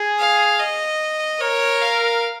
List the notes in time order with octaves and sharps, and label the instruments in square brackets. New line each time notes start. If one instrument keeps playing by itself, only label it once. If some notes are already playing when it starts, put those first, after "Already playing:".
Already playing: [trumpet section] G#4
[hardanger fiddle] F5
D#5
[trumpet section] A#4 [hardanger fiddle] C#5
[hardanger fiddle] F5